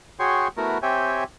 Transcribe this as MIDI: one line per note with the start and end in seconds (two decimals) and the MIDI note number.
0.20 0.48 66
0.20 0.48 68
0.20 0.48 73
0.20 0.48 79
0.20 0.48 84
0.20 0.48 85
0.57 0.78 57
0.57 0.78 59
0.57 0.78 64
0.57 0.78 66
0.57 0.78 70
0.82 1.24 60
0.82 1.24 67
0.82 1.24 73
0.82 1.24 76
0.82 1.24 79
0.82 1.24 80